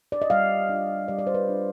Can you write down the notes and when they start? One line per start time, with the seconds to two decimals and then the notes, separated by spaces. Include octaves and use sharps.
0.12 D5
0.22 D#5
0.30 G3 F5
0.69 D4 F4
1.08 G3 D5
1.19 D5
1.27 C5
1.34 B4
1.48 D4 F4